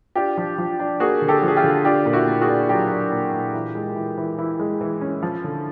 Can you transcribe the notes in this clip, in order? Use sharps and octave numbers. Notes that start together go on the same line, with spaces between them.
D4 F4 G4
F3
F3
D4
A#3 F#4 G#4
D3
G4 A4
F3
G#4
F4 G4
D3
D4 F4 G4
A#2
E4 F#4
A#3
F#4 G#4
D4
F#3 F4 G4
D4
A#2
A#2
E3
G#3
E3
E3
E3 E4
G#3
E3
C#4
F3
D3